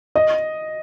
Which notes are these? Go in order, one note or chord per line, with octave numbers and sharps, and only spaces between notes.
D#5